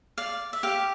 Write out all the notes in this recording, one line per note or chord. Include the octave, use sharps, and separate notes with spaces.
D5 F5
E5
G4 F5